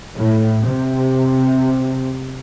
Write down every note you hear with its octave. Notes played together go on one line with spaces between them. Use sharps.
A2
C3